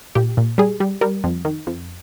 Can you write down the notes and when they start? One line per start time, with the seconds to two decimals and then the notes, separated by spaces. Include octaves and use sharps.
0.15 A#2 G4
0.37 A#2
0.58 G3 G#4
0.80 G3
1.01 G3 A#4
1.24 F2
1.45 D#3
1.67 F2